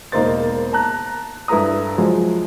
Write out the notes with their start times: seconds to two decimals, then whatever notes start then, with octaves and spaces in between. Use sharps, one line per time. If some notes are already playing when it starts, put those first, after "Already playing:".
0.12 E1 A#3 D#4 A#4 C5 A6
0.73 A5 A#5 F#6
1.48 G2 E4 A4 B4 A#5 D#6
1.98 F3 F#3 G#3